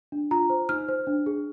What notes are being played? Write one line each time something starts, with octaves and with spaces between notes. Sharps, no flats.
D4
F4 A#5
C5
D#4 F6
C5
D4
G#4